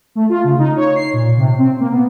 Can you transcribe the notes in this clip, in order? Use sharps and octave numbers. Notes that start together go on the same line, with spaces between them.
A3
F4
C#3
D#4
C#5
C7
A#2
C3
C4
A#3
B3